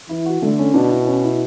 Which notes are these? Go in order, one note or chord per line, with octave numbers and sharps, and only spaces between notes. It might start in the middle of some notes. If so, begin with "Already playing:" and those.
E3 E4
F#4
D3 A3
C#4
B2 D4
E4
C#4
E4